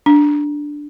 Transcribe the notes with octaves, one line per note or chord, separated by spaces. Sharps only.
D4